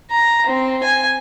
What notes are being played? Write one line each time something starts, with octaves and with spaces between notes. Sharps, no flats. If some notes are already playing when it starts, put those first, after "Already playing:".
A#5
C4
G#5